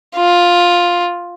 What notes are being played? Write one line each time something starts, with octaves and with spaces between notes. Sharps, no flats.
F4